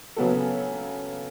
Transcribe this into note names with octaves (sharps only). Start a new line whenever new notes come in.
C#3 F#3 B3 F#4 A4